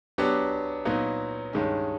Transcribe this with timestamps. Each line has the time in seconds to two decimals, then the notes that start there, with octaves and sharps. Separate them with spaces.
0.18 F#3 B3 D4 G4
0.85 A#2 F#3 B3 D#4
1.53 G2 D#3 G#3 C#4